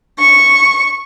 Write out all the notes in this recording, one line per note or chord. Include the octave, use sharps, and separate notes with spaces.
C#6